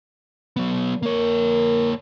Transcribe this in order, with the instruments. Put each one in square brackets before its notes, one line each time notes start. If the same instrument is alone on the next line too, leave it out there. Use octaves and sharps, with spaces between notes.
[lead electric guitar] F#3 B3
[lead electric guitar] A#3 C#5 [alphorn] A#4